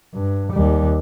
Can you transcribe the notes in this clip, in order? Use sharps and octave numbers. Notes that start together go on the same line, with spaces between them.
G2
D#2 G3